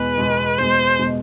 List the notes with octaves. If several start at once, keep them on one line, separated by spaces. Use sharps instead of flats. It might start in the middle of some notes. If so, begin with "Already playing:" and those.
Already playing: E2 B2 G#3 B4
E2 B2 G#3
E2 B2 G#3 C5
B2 G#3